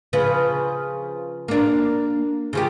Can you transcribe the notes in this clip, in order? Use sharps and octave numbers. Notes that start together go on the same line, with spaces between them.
C#3 F3 B4
A#3 D4
C#3 F3 G4